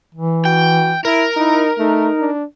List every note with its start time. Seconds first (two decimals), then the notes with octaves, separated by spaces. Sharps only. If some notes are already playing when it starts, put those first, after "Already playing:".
0.15 E3
0.45 F#4 G5
1.05 E4 A#4
1.37 D#4 E4
1.78 A3 D#4
2.20 D4